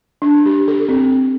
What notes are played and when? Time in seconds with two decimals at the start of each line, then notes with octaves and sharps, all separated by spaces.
0.22 D4
0.46 G4
0.68 A4
0.89 C4